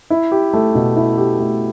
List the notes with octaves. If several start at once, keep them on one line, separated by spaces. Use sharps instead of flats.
E4
G4
A3
B2
E4
G4
A3